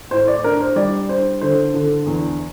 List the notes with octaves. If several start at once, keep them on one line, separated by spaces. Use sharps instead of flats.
A2 C5
D5
D4 A#4
C5
G3 D5
D4 C5
D3 C5
D3
E2